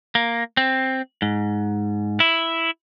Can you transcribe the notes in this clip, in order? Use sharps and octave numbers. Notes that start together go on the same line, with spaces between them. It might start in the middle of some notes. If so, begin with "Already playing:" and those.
A#3
C4
G#2
E4